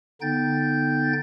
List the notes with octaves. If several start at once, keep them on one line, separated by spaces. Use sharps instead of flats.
D3 B3 D#4 G5 G6 A6